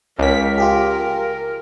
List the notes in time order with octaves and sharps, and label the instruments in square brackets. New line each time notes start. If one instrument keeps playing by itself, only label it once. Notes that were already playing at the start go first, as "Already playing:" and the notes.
[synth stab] C#2 B6 [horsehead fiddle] A#4
[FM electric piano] F4 G4 G#4